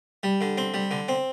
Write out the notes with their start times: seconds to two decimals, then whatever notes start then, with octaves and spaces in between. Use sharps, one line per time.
0.23 G3
0.41 D3
0.58 C4
0.74 G3
0.91 D3
1.08 C4